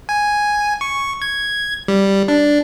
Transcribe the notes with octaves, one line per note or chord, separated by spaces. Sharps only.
G#5
C#6
G#6
G3
D4